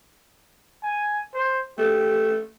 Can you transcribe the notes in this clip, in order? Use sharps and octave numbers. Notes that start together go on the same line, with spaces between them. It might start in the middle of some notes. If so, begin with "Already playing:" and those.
G#5
C5
A3 G4